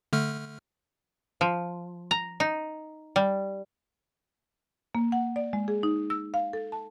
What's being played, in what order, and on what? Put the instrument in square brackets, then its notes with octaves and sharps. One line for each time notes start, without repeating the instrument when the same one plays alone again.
[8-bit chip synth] D3 A3 F6
[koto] F3
A#5
D#4
G3
[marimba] A#3
F#5
D5
G#3
G#4
D#4
E6
F5
A4
A5